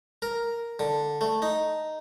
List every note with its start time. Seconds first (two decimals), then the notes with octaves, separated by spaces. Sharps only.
0.22 A#4
0.79 D3
1.21 A3
1.42 D#4